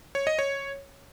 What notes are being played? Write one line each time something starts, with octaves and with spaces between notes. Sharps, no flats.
C#5
D#5
C#5